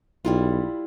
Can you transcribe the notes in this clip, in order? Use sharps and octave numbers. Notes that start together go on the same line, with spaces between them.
B1 G3 E4 F4